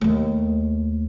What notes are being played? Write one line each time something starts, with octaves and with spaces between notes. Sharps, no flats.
D#2 A3